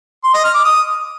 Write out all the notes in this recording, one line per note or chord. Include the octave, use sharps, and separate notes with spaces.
C6
D#5
F6
D6
D#6